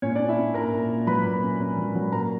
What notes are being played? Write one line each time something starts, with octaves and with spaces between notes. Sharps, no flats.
A#2 C#4 C#5
D4 D5
C#4
E4 E5
C#4
A#2 A#4 A#5
A#2
A#2
F#3 B4 B5
A#2
C#4
C#4
F#3
F#3
A#2 A#4 A#5